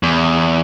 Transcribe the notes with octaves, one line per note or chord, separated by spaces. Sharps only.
E2